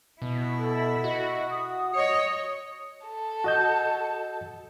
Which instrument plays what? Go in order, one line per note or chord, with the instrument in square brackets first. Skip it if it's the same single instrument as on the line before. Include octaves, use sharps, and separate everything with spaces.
[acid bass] B2 [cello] E4
[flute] A4
[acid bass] F#4 [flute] D#5
[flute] D#6
[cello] C#5 D#5 [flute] D#6
[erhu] A4
[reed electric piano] F#4 D#5 G6